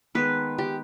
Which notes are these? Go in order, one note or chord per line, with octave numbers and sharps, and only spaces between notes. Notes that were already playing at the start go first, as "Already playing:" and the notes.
D#3 G#3 B3 B4
G4